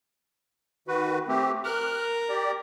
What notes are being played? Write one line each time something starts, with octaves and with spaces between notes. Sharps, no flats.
D#3 F#4 B4
A3 C4 G4
A#4 F6 F#6
G4 D5